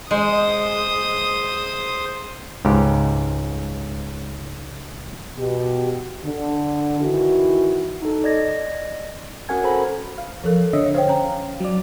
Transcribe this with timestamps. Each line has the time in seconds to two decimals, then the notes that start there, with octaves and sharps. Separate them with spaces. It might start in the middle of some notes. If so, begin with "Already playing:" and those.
0.11 G#3 C5 D#6
2.65 C#2 G#2 G4
5.38 B2 G4
6.25 D3
7.00 D#3 E3 E4 F#4
8.02 D#4 A4
8.24 D5 D#5 G#6 A#6
9.49 C#4 F#4 A#4 F#5 G#5 G#6
9.64 A4 C5 A#5 B5
10.18 F5
10.44 F3 A4 A#4
10.73 D3 C#5 D#5 E5
10.94 C5 C#5 F5 G5
11.08 C#4 A#5
11.60 F#3 D5